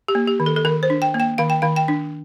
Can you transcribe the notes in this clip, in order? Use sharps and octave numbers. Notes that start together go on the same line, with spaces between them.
G4
A#3
G4
D#3
A4
A4
D#3 A#4
C5
D4
G5
A#3
G5
D#3 F5
G5
D#3 F5
G5
D4